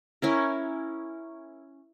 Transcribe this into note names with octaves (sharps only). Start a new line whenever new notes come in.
C#4 E4 A#4